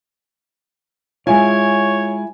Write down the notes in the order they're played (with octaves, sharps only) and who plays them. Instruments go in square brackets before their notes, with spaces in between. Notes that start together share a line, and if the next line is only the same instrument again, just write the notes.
[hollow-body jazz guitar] G#3 E4 F4 [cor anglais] C#5 [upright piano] G#5